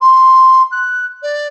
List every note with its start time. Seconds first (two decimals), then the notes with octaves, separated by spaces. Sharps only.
0.01 C6
0.71 F#6
1.22 D5